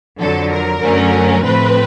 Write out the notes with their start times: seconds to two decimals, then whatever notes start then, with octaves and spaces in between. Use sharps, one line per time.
0.20 F2 D3 F#3 A4
0.51 A#4
0.82 F#2 D3 F#3 A3 C#4
1.43 A2 F3 A3 C4 B4